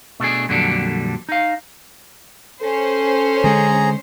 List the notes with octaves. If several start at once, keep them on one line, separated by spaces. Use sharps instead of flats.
B2 A3 D4 G#4
F2 A#2 D3 F#3 G3 D4
D#4 F5
C#4 A4 C5 C6
D3 G#3 G#4 A#5